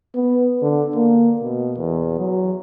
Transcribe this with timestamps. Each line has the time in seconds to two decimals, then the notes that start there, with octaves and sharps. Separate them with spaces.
0.15 B3
0.62 D3
0.95 A#3
1.42 B2
1.77 E2
2.19 F#3